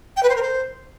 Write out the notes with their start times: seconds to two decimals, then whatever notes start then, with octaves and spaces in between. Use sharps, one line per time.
0.17 G5
0.23 B4
0.29 C5
0.36 A#4
0.42 C5